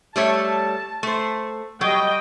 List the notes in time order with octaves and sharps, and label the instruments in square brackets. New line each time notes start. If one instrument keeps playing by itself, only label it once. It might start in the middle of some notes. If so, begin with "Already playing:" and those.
[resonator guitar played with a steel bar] G3 A3 C#5 [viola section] A5
[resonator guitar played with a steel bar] A3 C5
[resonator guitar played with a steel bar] F#3 [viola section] G3 D#5 G5